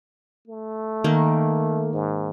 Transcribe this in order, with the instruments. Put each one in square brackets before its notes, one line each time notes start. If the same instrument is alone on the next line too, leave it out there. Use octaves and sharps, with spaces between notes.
[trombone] A3
[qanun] D#3 A#3
[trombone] G#2